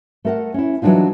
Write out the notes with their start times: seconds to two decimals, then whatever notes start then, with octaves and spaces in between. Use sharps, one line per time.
0.25 A3 A#4 F#5
0.54 C#4 E4
0.82 E3 F#3 G3 D4 D#4 F4